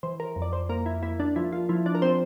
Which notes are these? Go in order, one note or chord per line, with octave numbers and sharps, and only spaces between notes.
E3 C5
A#4
F2
D5
C5
A#3 A#4
E4
A#3 E4
D4
F3 E4
F4
F3 E4
D4
A#4
C4 C5